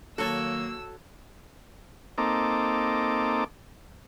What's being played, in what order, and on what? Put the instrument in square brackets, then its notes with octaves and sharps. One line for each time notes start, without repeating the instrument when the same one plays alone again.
[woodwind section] D#3 F#3 A#3 [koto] F#4 C#5 [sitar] A4 [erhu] E6
[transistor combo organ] A#3 C4 D#4 A4 D6